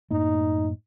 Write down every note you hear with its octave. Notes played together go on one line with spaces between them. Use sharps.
F#2 A2 A#3 D#4